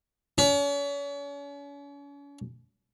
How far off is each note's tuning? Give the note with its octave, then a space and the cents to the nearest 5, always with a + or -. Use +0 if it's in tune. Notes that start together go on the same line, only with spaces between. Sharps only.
C#4 +40